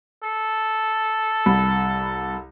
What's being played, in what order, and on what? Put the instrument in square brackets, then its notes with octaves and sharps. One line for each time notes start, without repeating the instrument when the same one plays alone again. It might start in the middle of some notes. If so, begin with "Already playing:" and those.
[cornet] A4
[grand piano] C2 B5